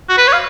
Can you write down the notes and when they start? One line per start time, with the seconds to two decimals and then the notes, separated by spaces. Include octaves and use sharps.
0.09 F#4
0.17 B4
0.27 C#5
0.33 F5